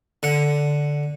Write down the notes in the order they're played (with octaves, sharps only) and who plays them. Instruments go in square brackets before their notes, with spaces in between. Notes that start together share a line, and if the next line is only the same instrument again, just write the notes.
[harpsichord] D3 F#5